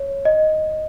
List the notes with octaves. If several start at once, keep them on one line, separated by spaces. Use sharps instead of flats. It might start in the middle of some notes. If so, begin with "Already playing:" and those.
Already playing: C#5
D#5